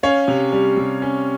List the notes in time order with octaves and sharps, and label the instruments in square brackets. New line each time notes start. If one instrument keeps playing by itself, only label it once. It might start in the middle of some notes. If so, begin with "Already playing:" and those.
[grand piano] C#4 C#5 F5
C3
G3
C3
C#4